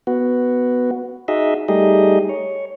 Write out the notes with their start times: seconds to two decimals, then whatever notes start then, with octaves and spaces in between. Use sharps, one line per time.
0.07 B3 F#4
1.28 D#4 F#4 G#4 D#5 E5
1.69 G3 A3 D#4 G4 G#4 D#5
2.29 C#5